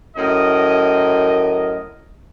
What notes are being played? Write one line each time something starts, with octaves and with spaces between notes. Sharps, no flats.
F#2 A2 A#4 D#5